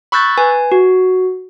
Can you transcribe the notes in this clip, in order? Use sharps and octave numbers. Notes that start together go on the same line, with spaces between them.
B5 C#6 E6 F#6 G6 A6
B4 G#5
F#4